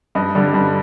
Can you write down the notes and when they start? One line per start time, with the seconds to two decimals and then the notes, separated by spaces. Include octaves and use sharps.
0.15 G2 D#5
0.35 D3 G3
0.54 G2